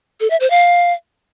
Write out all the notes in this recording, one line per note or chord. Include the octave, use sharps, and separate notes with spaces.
A4
E5
C5
F5